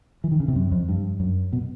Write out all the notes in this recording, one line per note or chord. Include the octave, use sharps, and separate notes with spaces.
E3
D#3
C#3
C3
F#2
F2
G2
F#2
B2